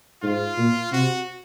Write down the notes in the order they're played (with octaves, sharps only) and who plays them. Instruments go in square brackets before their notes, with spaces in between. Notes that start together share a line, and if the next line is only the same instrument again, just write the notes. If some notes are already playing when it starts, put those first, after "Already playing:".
[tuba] G#2 [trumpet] F4
[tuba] A#2
[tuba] C3 [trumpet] F#4